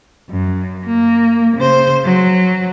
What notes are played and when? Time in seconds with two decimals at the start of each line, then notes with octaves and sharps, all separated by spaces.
0.30 F#2
0.85 A#3
1.57 C#3 C5
2.05 F#3